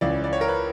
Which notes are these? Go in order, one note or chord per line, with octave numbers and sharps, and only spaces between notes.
C#2 C#3 E3 D5
D5
C#5
A#4
B4